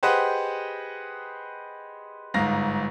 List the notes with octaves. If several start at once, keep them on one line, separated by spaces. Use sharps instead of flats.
G4 G#4 B4 C5 D#5 F#5
G1 G#2 F5 A#6